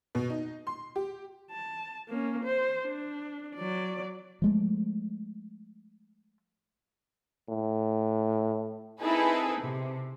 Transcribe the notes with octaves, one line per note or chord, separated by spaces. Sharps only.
B2
D#4
C6
G4
A5
A#3 C#4
C5
D4
F#3 D5
F3 G#3 A3
A2
C4 D#4 E4 G#4 A4 B4
C3